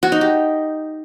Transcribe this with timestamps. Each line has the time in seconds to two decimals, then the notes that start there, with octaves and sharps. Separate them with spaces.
0.03 F#4
0.12 D#4
0.21 G4